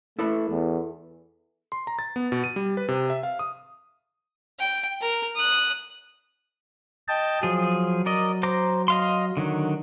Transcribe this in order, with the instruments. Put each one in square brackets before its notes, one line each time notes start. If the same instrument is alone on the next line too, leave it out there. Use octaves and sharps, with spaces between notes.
[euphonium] A3 [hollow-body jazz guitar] E4 A4 B4
[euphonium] E2
[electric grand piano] C6
A#5
A6
B3
B2
D#7
G3
B4
C3
E5
F5
D#6
[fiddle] G5
A#4
D#6 F#6
[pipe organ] D#5 G5 A5
[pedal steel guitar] F3 G#4 [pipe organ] F#3
[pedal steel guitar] A#4 D5 D#5
C5 A#5 D6
D#5 F5 C6
D3 D#3 F#3